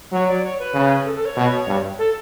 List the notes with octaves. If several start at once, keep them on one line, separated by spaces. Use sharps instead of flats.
F#3 C#5
D5
C#5
B4
C#3
A4
A4
C#5
B2
G2
A4